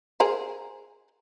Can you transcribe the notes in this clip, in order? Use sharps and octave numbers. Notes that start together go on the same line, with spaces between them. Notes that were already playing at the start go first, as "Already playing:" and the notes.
G#4 A#4 C5